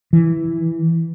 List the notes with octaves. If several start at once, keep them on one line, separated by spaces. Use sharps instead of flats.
E3